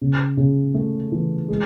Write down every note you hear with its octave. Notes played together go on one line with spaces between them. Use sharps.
C#3
C#3
A3
E3
G#3